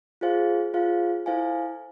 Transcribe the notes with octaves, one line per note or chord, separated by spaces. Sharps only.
F4 G#4 C5 F5
F4 G#4 C5 F5
E4 A4 C5 F5 G#5